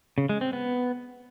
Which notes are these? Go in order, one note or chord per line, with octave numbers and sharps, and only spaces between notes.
C#3
G#3
C4
B3